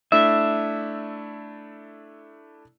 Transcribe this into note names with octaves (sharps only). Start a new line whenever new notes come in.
A3 D4 E4 E5